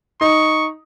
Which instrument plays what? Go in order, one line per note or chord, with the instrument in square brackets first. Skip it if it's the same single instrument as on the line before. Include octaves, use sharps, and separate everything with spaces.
[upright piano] D#4 [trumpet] C#6